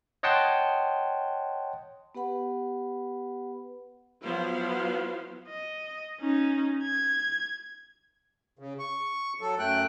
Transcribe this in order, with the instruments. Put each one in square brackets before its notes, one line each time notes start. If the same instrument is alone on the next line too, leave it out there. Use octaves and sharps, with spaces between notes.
[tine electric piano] C#5 D#5 F#5 G5 A5 C6
[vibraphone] B3 G4 B4 F#5 B5
[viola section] F3 F#3 B3 E4 C5 F5
[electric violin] D#5
C#4 D#4
G#6
[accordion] C#3
C#6
F#3 A4
F#2 A3 G5 F#6